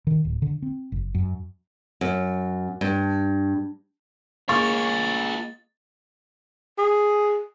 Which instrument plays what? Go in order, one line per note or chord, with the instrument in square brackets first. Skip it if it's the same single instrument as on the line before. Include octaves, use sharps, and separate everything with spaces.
[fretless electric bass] D#3
D1
D3
C4
F#1
F#2
[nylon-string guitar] F#2
G2
[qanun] G#3 A#3 C#5 [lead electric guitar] F4 G#4 [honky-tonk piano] C#6 [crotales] A6
[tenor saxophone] G#4